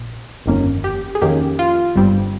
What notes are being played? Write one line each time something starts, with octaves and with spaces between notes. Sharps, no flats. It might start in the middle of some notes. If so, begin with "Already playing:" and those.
Already playing: A#1 A#2
G1 F2 D#3 A#3 C#4
G4
G#4
F2 D#3 A#3 C#4 G4
F4
G1 G2 G3 C4